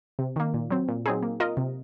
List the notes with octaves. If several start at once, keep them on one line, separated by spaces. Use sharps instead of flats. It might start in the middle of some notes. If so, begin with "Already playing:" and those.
C3
D#3 A#3
A#2
F#3 C4
A#2
F#3 C4 D#4 G#4
A#3
F4 A#4 D#5
C3